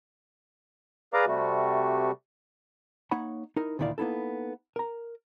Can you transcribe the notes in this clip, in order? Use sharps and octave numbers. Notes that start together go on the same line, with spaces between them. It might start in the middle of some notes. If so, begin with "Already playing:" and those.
G#4 B4 D5 F5 A#5 D6
C3 G3 A3 F#4
A#3 D#4 C#5 F#5 B5
D#4 E4 A#4
D2 A#2 D#3 E4 D5 F5
A#3 B3 D#4 E4 A4
A#4 A#5